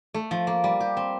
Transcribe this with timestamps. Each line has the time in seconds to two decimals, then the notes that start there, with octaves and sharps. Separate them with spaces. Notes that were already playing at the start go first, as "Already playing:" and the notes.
0.14 A3
0.31 F3
0.47 A#3
0.64 G3
0.80 G4
0.97 C4